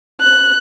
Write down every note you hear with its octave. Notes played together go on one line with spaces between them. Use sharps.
F#6